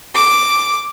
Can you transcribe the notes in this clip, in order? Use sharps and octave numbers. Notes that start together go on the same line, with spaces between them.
D6